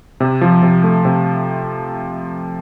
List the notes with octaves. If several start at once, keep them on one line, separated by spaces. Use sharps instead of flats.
C3
F3
C3
A3
C3